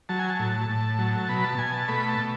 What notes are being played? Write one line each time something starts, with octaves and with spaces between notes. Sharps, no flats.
F#3 A5
G#5
A5
A2
A2
F#3
B2 B5
A5
B2 G#5
A5
A3 B5
A5
B2